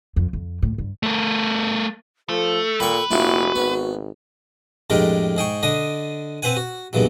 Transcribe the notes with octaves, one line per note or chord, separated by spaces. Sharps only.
F2
F2
A2
G2
A3 A#4
F3 A3 A4
A#2 B4 G5 C#6
F1 A#2 D4 E4 F#4
G#1 B3
F2 A2 G#3 D4 G4 A#4
G#2 G#4 G5 C#6
D3 D4 D#5 D#6
C4 B4 C5 F#5 G#5
F#4
B1 G2 A#2 C#3 E3 F#3